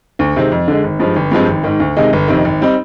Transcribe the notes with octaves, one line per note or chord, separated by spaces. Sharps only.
D2
C3 D#3 G#3 C4
F2
D3 G#3
G#1
G2 F3 G#3
G1
G2 F3 G#3 C4
G#1
G#2 D#3
D2
C3 D#3 G#3 D#4
G1
F2 C3 D#3
G#1
G3 C4 D#4